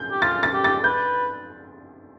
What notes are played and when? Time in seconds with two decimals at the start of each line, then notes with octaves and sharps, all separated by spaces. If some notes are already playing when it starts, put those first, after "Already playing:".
Already playing: G6
0.12 G4
0.22 F4 A6
0.43 A6
0.54 G4
0.64 A6
0.84 B4 G6